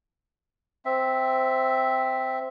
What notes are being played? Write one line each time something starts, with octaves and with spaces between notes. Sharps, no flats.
C4 E5